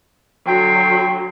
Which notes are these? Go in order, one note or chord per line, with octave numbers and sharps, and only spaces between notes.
D3 F#3 G5 C6